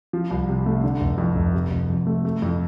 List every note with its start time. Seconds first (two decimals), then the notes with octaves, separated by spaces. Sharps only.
0.13 F3
0.31 C2
0.49 C3
0.66 A3
0.84 D3
1.01 F1
1.18 F2
1.36 F1
1.54 C3
1.71 F1
1.90 F2
2.07 A3
2.25 A3
2.42 F2